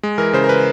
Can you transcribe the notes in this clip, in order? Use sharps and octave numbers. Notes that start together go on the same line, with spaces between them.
G#3
E3 A#4
C#3 C5
A#4
B4